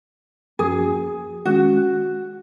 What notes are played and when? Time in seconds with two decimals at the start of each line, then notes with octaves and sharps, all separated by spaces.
0.59 F#2 F3 A#3 C#4 F#4 G#4
1.45 D#3 G#3 C#4 F#4